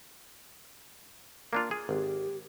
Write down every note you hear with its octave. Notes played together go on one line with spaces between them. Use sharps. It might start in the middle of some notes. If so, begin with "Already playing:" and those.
A#3 D4 F4
G#4
G#1 G4